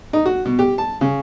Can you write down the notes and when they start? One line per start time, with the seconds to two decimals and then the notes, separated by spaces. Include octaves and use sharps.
0.13 D#4
0.26 F#4
0.45 B2
0.59 G4
0.78 A5
1.01 C#3